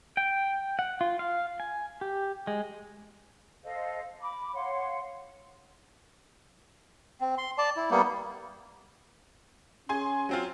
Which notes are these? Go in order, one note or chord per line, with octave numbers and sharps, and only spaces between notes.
G5
F#5
F4
F5
G#5
G4
G#3
A4 C5 D#5 F5
B5 D6
C#5 F5 F#5 C6
C4
C6
D5 A5
E4
G3 A#3 B3
C#4 G#4 G#5 C6
F#3 C4 F4